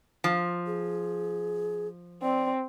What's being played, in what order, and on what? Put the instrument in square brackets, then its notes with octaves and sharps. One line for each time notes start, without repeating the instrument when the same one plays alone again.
[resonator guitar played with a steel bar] F3
[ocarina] G#4
[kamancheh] C4 [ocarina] D5